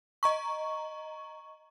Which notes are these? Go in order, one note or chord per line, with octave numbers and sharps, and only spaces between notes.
D#5 A#5 C#6